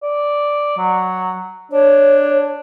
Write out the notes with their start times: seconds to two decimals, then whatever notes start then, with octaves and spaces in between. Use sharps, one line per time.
0.03 D5
0.78 F#3
1.72 D4 C#5